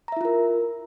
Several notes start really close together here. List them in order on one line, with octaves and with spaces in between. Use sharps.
A#5 E5 E4 F4 A#4